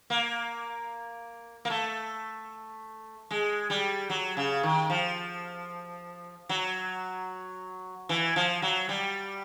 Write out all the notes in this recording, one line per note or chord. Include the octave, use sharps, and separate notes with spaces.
A#3
A#3
A3
G#3
G3
F#3
C#3
D#3
F3
F#3
E3
F3
F#3
G3